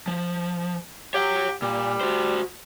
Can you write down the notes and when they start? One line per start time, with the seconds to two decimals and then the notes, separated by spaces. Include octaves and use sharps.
0.07 F3
1.14 G4 C#5 F#5
1.62 A#2 G3
2.01 F#4 C5